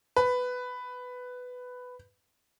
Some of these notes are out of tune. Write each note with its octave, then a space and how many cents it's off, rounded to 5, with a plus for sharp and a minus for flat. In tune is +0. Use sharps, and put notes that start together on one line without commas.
B4 +10